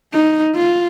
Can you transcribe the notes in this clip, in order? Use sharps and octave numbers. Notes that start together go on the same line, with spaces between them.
D#4
F4